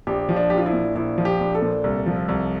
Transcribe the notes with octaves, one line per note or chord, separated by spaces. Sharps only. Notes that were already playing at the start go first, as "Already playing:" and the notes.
A#1 G4
F3
D4
A#1 G4
F4
E4
A#2
A#1 E4
F3
G4
A#1
A4
A#2
C2
F3
C2